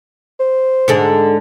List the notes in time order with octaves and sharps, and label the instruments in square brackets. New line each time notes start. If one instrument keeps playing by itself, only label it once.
[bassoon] C5
[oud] G#2 D3 G#3